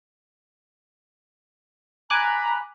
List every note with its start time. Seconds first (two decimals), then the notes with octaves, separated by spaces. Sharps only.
2.10 G#5 A#5 B5 D6 F#6